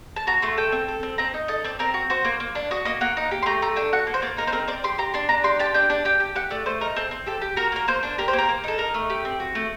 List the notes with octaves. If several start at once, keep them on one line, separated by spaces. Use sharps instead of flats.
A5
F#4 A#5
A3 C6
A4 G5
C4
A4
C4
C4 A#5
D#4
A4 D#5
C4 D5
C4 A#4
F#4
F#4 C5
A#3
A#3
D4
F#4 D#5
A#3 D#5
A#3 F#5
D#4
G4
C6
A3 A#5
A3 A#5
D4 G5
F#4 F#5
A#3
C5
A#3 D5
D#4 A#4
C5
C4 A#4
C4 D5
G4 C6
G4 A#5
D4 C6
D4 A#5
G4 C6
G4 A5
D4 G5
D4
G4 G5
G4
G4 F#5
A3 D5
A3 C5
D#4 A#4
C4 A4
C4
G4 A4
G4
F#4 A#4
A#3 A#4
A#3 C5
D4
G4 A#4
C5
A#3
A#4
A#3
D#4 A4
D#4 A#4
A3
G4
C4
F#4
A3